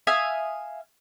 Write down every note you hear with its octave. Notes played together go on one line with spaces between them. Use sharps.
E5 F5 G#5 D#6